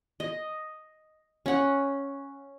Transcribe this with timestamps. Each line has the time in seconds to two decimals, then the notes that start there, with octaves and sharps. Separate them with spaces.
0.20 D#5
1.46 C#4 F#5